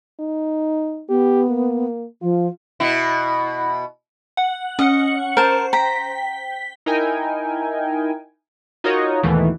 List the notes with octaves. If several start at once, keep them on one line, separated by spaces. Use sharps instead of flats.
D#4
B3 G4
A#3
F3 F4
B2 E4
F#5
C#4 D#5 F#5 C#7
A#4 C5 A5
G5 A#5 B6
D#4 E4 A#4 G5 G#5
D#4 F4 F#4 A#4 C#5 D#5
D#2 G#2 B2 E3 A3